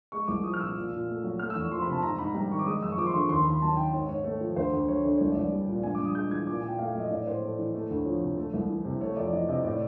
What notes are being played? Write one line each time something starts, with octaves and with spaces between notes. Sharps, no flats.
G#3 C#6
C2 D6
F3 D#6
F6
A#2 E6
A#2
A#2
A3
F#3
A3 F6
E6
E2
C#6
F3 C6
B5
C3 A5
G#2 A#5
G#2 B5
G3 A#5
D#3 C#6
D6
G#3 D#6
F#2 E6
C#6
F3 D6
C6
D3 C#6
D#2 C6
D#2 B5
F#3 A5
D#3 G5
G#2 C#5
G#2 C#5
A3
F3
D2 C5
D2
F#3 C#5
D3 D5
C2 C#5
C2 D5
G3
A#2
G2 G#5
D6
G2
D#6
G#3 G6
E3 G#6
A#2 D6
A#2 G#5
G5
A3 F5
E5
F#3 D#5
A2 D5
A2 C5
A3
E3
A3
D2
F3 C#5
C3
A3
C2
E3
C3
A3 C#5
F2 D5
E3 D#5
C3 D#5
A2 D5